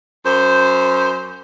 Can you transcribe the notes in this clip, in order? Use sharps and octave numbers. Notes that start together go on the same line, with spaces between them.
F#2 C5